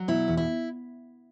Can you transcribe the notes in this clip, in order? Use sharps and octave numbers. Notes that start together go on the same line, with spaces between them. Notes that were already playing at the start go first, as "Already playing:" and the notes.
Already playing: F#3
B2 E4
E2
E4